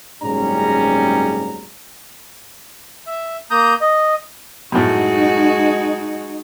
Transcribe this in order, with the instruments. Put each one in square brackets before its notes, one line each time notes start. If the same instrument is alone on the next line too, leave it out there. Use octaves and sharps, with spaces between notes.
[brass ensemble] F#1 G#2 G3 C4 C#4 A#5
[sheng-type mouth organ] E5
A#3 A#5 D#6 G6
D#5
[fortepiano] F#2 A2 [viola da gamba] G#3 F#4 [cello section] D#4